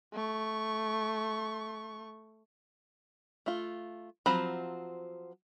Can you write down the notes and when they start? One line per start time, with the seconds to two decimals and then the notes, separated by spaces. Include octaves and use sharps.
0.13 A3 C#6
3.46 A3 F4
4.26 F3 F#3 C4 A#5 B5